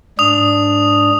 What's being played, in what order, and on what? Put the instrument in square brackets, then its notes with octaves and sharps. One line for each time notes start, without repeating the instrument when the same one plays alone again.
[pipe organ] G#2 D4 [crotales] D#6 F7